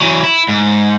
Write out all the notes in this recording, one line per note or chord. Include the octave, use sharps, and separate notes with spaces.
E3 F#3
E4
G#2